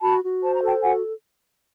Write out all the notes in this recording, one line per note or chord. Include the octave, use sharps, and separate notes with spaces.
F#4 A5 B5
F#4
C5 A5
A#5
A4 G5 A5
F#4 F#5 G#5